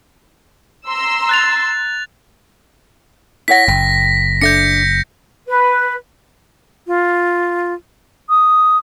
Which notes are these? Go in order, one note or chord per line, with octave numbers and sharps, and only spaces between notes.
A#5 C6 E6
F#6 A6 F7
E4 C#5 F#5 A#6 B6
F#1 G5
D4 A4 E5 G6 A#6 C#7
B4
F4
D#6